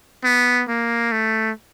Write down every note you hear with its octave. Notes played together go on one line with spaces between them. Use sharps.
B3
A#3
A3